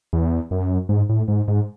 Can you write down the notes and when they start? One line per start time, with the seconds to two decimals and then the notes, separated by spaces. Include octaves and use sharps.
0.13 E2
0.51 F#2
0.89 G#2
1.09 A2
1.28 G#2
1.48 G#2